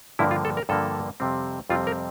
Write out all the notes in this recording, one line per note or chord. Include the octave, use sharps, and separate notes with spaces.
G2 D3 F3 A#3 E4
F4
A4
A#4
G2 D3 F3 A#3 A4
F2 C3 G3 C4
F2 C3 G3 C4 F4
A#4